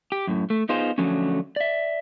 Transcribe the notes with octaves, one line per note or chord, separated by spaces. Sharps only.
G4
F#2 A2
A3
B3 D#4 F4 G#4 C5
D3 F3 F#3 A3 C#4
D5 E5